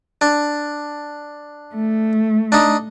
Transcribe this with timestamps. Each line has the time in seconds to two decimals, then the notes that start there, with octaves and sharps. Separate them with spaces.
0.21 D4
1.75 A3
2.52 D4 D#4